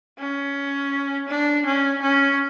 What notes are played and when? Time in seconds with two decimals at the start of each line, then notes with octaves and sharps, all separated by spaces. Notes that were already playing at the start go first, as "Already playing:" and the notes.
0.19 C#4
1.28 D4
1.66 C#4
2.02 C#4